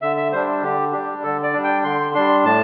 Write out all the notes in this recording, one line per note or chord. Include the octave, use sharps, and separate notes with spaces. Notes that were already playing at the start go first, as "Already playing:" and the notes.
D3 E5
E5
G3 D4 C5
D3 G4
G3 D4 G4
D3 A4
D5
G3 D4
G5
D3 C6
G3 D4 C6
A2 A5